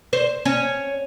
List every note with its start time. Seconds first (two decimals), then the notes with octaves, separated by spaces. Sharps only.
0.13 C5
0.45 C#4